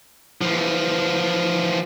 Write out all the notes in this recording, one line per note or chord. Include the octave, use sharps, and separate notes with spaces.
E3 F3